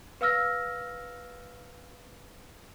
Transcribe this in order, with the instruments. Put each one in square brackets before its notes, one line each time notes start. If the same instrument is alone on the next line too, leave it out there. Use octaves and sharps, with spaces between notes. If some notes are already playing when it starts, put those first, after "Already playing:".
[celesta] B4 F5 E6 F6 A#6